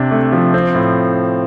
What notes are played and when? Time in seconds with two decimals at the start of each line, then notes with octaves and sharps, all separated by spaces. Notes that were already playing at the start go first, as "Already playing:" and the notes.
Already playing: C3 D4
0.11 A3
0.33 F3
0.54 C4
0.75 A2